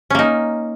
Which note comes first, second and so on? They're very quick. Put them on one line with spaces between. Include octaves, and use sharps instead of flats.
C#4 A#3 D#4